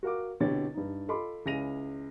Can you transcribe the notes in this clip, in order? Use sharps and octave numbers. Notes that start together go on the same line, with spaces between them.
F#4 A#4 F5 D6
C2 B2 D3 G4 C#5 A6
G2 D#4
F4 A4 D#5 B5 C6 D6
C#2 C#4 E4 A#6 D#7 F7